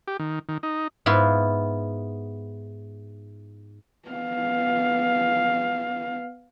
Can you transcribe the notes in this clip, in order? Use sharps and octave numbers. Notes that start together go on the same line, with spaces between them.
G4
D#3
D#3
D#4
G#2 B3 E4 F4 C6
B3 F5